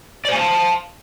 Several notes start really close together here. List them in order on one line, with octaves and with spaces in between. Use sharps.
D5 C5 G#5 F5 A5